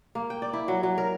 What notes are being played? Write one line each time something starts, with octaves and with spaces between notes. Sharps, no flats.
A#3
G5
D5
E4
F#3
F#3
A#4